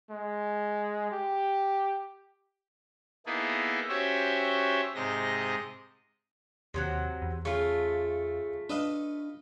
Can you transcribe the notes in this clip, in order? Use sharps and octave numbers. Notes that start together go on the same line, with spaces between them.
G#3
G4
A#3 B3 D#4 E4 G#4 A4
C#4 F#4 G4 C5 C#5 E5
G#2 C3 G#3 D#5 A#6
D#2 C3 F#3 F#5
E2
C#3 A3 F4
D4 B4 D#5 F5